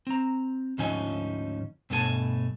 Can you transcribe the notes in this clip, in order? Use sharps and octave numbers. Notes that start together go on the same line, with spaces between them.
C4 A#5
D2 G#2 F3 C#4 D#4 G#5
G2 B2 A3 F4 G#5 A5